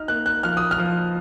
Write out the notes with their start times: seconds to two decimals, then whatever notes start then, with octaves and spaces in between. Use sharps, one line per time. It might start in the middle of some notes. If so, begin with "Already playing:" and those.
Already playing: D#4 F6
0.08 A#3 F#6
0.26 F#6
0.43 F3 F6
0.57 D#6
0.71 F6
0.78 F3